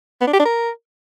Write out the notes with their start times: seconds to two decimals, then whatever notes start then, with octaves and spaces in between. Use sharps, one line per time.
0.21 B3
0.27 D4
0.33 G4
0.40 D4
0.46 A#4